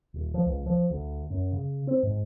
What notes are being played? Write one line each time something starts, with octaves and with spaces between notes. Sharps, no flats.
D#1
F3
C#2
F3
D2
F#2
C#3
C4
G#2